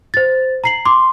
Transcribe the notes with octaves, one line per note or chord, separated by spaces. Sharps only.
C5 A6
A#5 C7 F#7
C6 D6